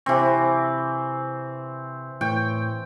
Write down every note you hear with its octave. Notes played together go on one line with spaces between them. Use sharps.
C3 E3 C4 C5 C#6
A2 E3 G5 C#6